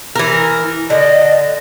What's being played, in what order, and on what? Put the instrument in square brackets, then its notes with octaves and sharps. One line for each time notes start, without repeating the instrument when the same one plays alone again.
[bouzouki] E3 A#4
[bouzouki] D3 [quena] D#5